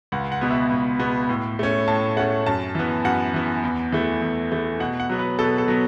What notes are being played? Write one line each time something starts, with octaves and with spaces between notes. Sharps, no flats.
C#2 F#5
F#5
B2 B3
E5
C#2
B2 B3
A2
A3 C#4
A2 A5
A3 C#4 F#5
F#2 A5
E3 B3
F#2 F#5
E3 B3
E2
E3 A3
E2
E3 A3
B2 F#5
F#5
F#3 B3
B4
B2 A4
A4
F#3 B3